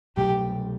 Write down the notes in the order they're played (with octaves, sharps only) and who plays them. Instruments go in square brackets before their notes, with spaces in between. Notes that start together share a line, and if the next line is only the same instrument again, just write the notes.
[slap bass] C2 B2 F#3 A3 [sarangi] G4